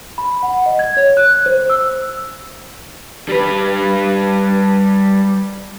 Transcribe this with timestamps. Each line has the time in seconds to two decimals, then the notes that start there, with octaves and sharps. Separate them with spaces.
0.18 B5
0.43 F#5
0.66 D#5
0.79 G#6
0.97 C#5
1.17 F#6
1.46 C5
1.70 E6
3.29 G3 B4